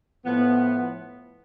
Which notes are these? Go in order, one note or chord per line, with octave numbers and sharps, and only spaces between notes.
A2 F3 B3